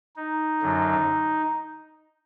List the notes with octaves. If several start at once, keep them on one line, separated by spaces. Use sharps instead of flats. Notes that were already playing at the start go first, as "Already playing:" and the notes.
D#4
F#2 D3 F#3